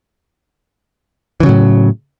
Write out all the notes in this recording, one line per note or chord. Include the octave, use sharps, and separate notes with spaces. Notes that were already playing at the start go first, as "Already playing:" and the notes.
A2 C#3 E3 F#3